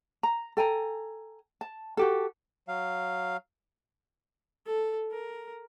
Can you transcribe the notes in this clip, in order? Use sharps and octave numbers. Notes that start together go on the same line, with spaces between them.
A#5
A4 G5 G#5 A#5
A5
F#4 G4 A4
F#3 F5
A4
A#4